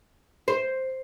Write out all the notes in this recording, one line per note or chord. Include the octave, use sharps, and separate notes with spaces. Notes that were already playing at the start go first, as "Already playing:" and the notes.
C5